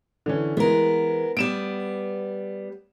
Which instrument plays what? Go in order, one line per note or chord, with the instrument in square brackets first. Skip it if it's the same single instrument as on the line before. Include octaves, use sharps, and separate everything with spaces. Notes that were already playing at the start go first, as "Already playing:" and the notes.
[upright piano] D3 E3 C#4
[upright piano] E3 G#3 [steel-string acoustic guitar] B3 A#4
[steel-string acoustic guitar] G3 B3 [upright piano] D7 E7